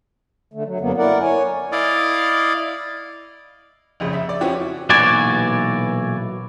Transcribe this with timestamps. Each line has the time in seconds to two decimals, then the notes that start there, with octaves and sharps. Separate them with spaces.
0.53 D3 A3
0.65 F#3
0.80 F#2 D3 F#3 A#3 B3
0.97 E4 A#4 D5 F#5
1.21 C#5 G#5
1.72 E4 D5 D#5 F5
4.00 A#1 F2 C#3
4.13 E5
4.29 D5
4.41 F3 C4 C#4 E4 F#4 G4
4.90 B1 A#2 E3 F#4 D5 G#5